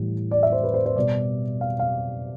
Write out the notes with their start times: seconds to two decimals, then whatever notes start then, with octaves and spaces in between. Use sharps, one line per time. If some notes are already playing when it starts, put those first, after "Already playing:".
Already playing: A2 E3 G3
0.31 D5
0.43 E5
0.52 C5
0.64 B4
0.74 C5
0.86 C5
0.96 B2 G3 D5
1.61 F5
1.79 F5